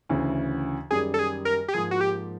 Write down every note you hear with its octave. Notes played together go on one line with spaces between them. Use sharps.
D2 C#3 E3
F#2 D#3 G3 G#4
A4
G#4
A#4
G4
G#2 F3 A#3 G#4
F#4
G4